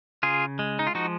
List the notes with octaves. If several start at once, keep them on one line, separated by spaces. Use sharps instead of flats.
C#3 F4 G#4
G#3
D#4
F4
F3 D#4 F#4